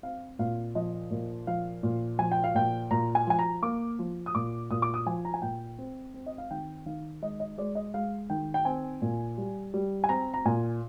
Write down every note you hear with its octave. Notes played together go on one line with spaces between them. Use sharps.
C4 F5
A#2 F5
F3 D#5
A#2
F3 F5
A#2
F3 G#5
G5
F5
A#2 G5
A#2 A#5
G#5
F3 G#5
A#5
A#3 D6
F3
D#6
A#2 D6
A#2 D#6
D6
D#6
F3 G#5
A#5
G#5
A#2 G5
C4
C4
D#5
F5
D#3 G5
D#3 F5
G#3 D#5
D#5
G#3 D5
D#5
G#3 F5
D#3 G5
G5
C4 G#5
A#2
G3
G3
G#5
C4 A#5
A#5
A#2 G#5